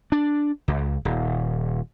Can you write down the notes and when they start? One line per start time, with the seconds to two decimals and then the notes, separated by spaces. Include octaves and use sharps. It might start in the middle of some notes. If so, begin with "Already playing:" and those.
0.12 D4
0.68 C#2
1.05 D#1